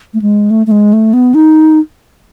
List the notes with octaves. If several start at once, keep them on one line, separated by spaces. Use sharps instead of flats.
A3
G#3
A3
A3
G#3
A3
B3
D#4